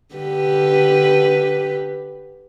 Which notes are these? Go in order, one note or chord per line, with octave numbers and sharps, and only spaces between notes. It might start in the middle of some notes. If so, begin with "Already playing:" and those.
D3 G4 B4